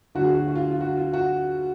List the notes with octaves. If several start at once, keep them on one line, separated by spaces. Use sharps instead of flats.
D2 D3 F#3 F#4
G#4
F#4
F#4
F4
F4
F#4
F4
F#4